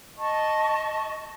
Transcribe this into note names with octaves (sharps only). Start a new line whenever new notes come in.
D#5 A5 C#6